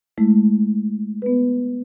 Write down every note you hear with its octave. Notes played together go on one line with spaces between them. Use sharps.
G#3 A3 E4
B3 B4